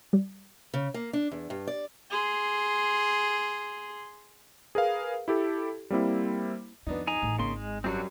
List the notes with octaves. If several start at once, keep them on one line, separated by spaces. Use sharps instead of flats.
G3
C#3
A#3
D4
E2
G2
D5
G#4 C6
G#4 A#4 B4 F5
E4 G4 A4
G3 A#3 C4 E4
F2 D#3 B3 D4 D#4
D#4 G#4 G#5 A#5
A1
G#1 C#3 A#3 C6
G#3
F#2 F#3 G3 C4 D4 F#4